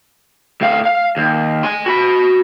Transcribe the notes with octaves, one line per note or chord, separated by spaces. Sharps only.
A2 F5
F5
D#2
G#5 C6
F#4 B5